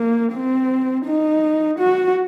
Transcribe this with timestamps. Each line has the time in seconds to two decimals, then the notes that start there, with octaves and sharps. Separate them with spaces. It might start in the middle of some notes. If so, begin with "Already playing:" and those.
Already playing: A#3
0.33 C4
1.06 D#4
1.79 F#4